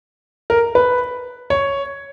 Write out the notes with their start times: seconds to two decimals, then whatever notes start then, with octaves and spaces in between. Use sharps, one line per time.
0.50 A#4
0.75 B4
1.50 C#5